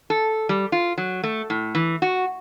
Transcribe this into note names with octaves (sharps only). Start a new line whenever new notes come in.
A4
G3
F4
F#3
A3
A2
E3
F#4